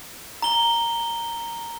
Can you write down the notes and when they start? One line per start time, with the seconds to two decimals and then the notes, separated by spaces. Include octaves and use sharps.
0.42 A#5 G7